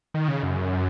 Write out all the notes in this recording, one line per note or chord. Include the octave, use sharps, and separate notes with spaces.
D#3
C#3
F#2